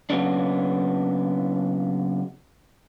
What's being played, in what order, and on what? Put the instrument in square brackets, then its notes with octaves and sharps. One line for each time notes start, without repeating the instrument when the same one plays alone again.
[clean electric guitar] C#3 F#3 A#3 B3 C#4 D4